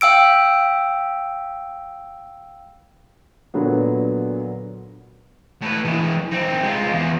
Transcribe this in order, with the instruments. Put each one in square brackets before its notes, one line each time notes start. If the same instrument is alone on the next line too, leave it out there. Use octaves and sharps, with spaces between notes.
[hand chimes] F5 G5 E6 D7
[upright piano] A#2 D3 F#3 B3
[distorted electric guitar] A2 B4
E3 G#3
C4 D#4
G#3 F4
E2